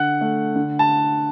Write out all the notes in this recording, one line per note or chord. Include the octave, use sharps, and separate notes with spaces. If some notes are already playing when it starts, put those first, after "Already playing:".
Already playing: D3 F#5 F#6
A3
D3
A5